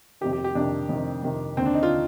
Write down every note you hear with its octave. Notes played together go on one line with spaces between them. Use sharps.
F2 C3 D#3 G4
G4
G4
F2 C3 D#3 D4
F2 C3 D#3
F2 C3 D#3
D#2 D3 C4
D4
D#4
F4
D3